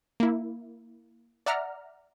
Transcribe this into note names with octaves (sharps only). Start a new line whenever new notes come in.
A#3 E4
D5 E5 F#5 A#5 F6